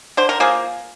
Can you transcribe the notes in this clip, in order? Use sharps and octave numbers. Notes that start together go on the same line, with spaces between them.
D3 C5
A#4
F3 A#3 G#4